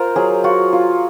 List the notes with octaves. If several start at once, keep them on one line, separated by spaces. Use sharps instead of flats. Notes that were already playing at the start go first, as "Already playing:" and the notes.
Already playing: F4 A#4 C5
F#3 G#4
F4 F#4
F4